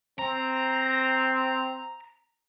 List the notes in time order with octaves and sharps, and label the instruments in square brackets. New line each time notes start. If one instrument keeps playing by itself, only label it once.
[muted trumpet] C4 [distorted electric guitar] A#5